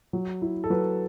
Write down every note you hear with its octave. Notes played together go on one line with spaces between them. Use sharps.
F#3
E4
A4
F#3 B4